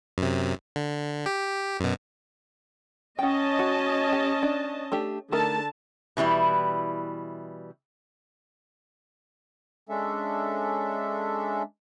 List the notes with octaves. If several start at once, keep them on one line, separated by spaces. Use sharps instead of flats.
F#2 C3
D3
G4
F#2 B2
C#4 D#5 F#5 G5 A5
F#4
G4
D4
A3 D4 G4
D3 A3 D#4 A#4 A5
B2 E3 G3 E4
G#3 C#4 D4 A4 E5